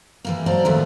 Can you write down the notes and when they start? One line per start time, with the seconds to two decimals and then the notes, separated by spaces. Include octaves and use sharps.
0.25 E3 G3 A#3
0.46 F#3 A#3 C5 D5 A5 A#5
0.65 D#2 A2 F3 A3 B3